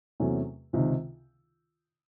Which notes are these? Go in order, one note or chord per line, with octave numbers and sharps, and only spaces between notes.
E2 C3 F#3 A3 C#4
C#2 C3 D#3